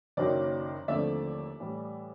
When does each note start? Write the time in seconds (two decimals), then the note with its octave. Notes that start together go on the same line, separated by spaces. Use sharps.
0.17 F#1 F#2 D#3 F#3 A#3 D5
0.88 D#2 D3 F3 A3 C4 D5 E5
1.60 A2 E3 G3